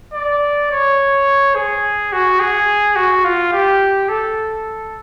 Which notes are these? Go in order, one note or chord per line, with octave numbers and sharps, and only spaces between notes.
D5
C#5
G#4
F#4
G#4
F#4
F4
G4
A4